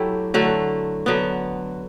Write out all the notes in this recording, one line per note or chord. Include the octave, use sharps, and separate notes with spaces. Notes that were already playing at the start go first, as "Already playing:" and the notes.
Already playing: F#3 A3 E4 G4
D3 F#3 A3
D3 F#3 B3